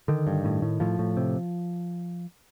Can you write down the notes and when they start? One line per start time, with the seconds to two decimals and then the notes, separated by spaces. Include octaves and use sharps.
0.08 D3 D#3
0.27 G2
0.44 A2
0.62 A2
0.80 A2 F3
0.99 A2
1.17 C3